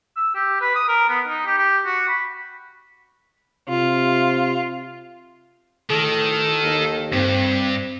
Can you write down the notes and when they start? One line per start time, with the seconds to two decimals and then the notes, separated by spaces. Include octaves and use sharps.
0.16 E6
0.35 G4
0.61 B4
0.75 D#6
0.89 A#4
1.09 B3
1.27 D#4
1.46 G4
1.58 G4
1.85 F#4
2.08 B5
3.69 C3 F4
5.90 A2 D#3 A4
6.64 D#2
7.13 G2 C4